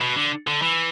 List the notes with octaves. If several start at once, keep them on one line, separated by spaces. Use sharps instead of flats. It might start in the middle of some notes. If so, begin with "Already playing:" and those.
B2
D3
D3
E3